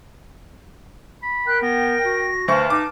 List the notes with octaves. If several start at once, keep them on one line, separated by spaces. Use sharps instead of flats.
B5
A#4 G5 F#6
B3 A#6
F#4
D2 B4 C5 F5 A5 C#6
D#4 D6